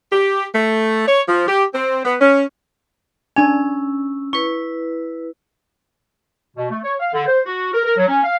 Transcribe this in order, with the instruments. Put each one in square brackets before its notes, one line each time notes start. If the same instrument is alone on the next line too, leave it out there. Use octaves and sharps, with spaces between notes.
[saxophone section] G4
A3
C#5
F3
G4
C4
B3
C#4
[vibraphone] C#4 E6 [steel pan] D4 G#5
[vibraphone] E4 B4 [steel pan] C#6
[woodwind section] B2
A3
C#5
F5
D3
C5
F#4
A#4
A#4
F#3
C#4
F5